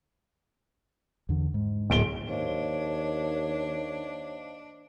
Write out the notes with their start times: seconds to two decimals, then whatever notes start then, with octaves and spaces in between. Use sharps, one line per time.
1.29 E2 D3
1.54 G#2
1.90 D1 A#3 B3 D7 G7
2.28 D#2 D4 C5 C#5 D#5 F5